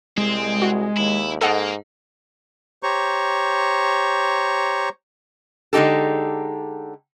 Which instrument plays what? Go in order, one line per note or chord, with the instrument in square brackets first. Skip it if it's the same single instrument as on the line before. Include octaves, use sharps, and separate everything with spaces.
[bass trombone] C2 [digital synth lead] G#3 [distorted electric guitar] C4
[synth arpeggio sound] F#4
[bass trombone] D#2 [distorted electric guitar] E4
[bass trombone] G#2 [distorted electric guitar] A#3 [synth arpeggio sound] A4 D#5 F#5
[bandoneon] G4 C5 C#5 A#5 C#6
[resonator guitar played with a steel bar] D3 G#3 D#4 G4 A4